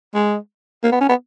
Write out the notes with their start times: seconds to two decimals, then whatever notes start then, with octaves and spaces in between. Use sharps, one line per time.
0.15 G#3
0.83 A#3
0.92 B3
1.01 C#4
1.09 B3